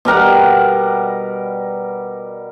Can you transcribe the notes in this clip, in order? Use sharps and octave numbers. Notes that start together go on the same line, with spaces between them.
B2 G3 A#4 F#5